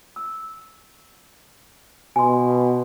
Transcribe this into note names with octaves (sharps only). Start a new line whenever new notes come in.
E6
B2 G#5 C6